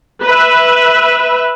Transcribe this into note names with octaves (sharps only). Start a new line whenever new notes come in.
B4 E5